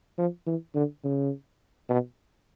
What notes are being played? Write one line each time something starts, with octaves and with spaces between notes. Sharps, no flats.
F3
E3
D3
C#3
B2